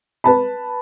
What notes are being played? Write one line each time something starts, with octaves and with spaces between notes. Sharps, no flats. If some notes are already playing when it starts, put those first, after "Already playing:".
B4 A5 B5